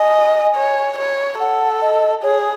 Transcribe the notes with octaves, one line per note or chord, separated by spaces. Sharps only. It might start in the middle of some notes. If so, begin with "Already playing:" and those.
Already playing: D#5 G#5
C#5
C#5
A4 F#5
D#5
G#4 C#5